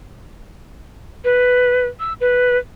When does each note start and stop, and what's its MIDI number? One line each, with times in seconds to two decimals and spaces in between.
1.25 1.87 71
2.00 2.13 88
2.21 2.58 71